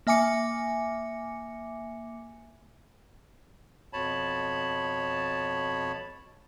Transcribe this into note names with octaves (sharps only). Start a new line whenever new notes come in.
A#3 E5 G#5 D6 C#7
F2 B2 C#5 A5 B5